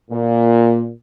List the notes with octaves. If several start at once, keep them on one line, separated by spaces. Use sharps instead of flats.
A#2